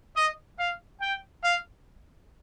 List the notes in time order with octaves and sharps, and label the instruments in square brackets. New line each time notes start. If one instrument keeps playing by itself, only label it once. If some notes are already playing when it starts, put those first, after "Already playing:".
[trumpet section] D#5
F5
G5
F5